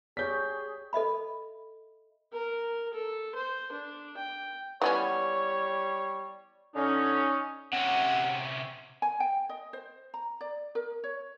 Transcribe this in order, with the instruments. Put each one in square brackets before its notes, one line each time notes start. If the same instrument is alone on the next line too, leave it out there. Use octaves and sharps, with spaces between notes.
[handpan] G4 C#5 D5 [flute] G#4 [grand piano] G6 B6
[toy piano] A4 D#5 E5 B5
[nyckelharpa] A#4
A4
C5
D4
G5
[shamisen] E3 B3 C#4 [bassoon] G3 [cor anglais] C#5
[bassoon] D3 [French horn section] C#4 [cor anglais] D#4
[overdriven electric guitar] C3 C#4 [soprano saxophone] F#5
[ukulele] G#5
G5
D#5
C5
A#5
D5
A#4
C#5